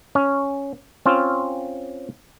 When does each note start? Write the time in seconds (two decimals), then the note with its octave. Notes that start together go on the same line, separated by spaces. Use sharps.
0.15 C#4
1.06 C4 C#4 F4